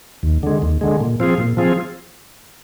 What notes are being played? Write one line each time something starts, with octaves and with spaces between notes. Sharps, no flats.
D#2
D3 G#3
D#2
D3 G#3
A#2
F3 C4 F4 G#4
A#2
F3 C4 F4 G#4